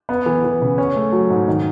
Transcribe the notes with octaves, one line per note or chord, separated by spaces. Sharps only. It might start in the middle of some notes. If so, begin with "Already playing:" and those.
B3
E3
E3
C#3
C#4
A3
F#3
G#2
D#3